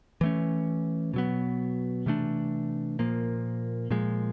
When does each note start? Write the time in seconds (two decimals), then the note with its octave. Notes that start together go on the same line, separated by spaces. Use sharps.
0.21 E3 A3 C#4
1.14 B2 F#3 B3
2.06 C3 E3 A3 D4
2.99 A#2 F3 A#3
3.90 A#2 F3 G#3